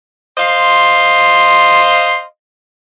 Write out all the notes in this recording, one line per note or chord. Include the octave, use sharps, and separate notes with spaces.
C5 D#5 F5 C6